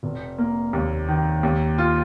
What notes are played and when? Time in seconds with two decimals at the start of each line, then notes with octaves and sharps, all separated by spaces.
0.03 F1
0.38 A#3
0.73 D#2
1.08 D#3
1.43 D#2
1.78 F4